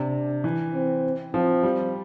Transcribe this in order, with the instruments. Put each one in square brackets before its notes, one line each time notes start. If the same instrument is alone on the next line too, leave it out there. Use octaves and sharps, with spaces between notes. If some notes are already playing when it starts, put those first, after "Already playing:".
Already playing: [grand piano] C3 [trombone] D4
[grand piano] E3
[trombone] C4
[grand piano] F3 [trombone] C4
[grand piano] G3